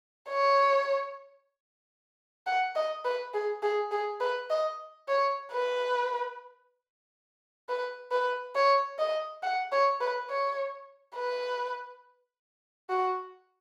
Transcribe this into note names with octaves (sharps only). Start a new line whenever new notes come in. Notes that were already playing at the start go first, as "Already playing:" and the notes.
C#5
F#5
D#5
B4
G#4
G#4
G#4
B4
D#5
C#5
B4
B4
B4
C#5
D#5
F#5
C#5
B4
C#5
B4
F#4